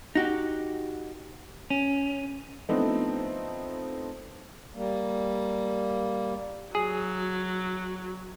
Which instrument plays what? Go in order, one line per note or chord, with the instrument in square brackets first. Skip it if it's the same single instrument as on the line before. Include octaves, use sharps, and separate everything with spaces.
[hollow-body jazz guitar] D#4 F#4 G4
[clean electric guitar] C#4
[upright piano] F3 A3 B3 C4 D4 D#4
[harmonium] G3 A#3
[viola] F#3 [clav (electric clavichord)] G#4